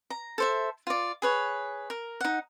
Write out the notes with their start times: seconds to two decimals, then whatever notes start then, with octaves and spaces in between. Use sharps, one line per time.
0.10 A#5
0.38 A4 C5 E5
0.87 F4 D5
1.22 G#4 B4 C#5
1.90 A#4
2.21 D#4 F#5